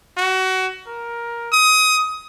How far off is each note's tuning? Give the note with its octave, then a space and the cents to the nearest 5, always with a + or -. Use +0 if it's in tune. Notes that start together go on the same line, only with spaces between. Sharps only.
F#4 +25
A#4 +10
D#6 +20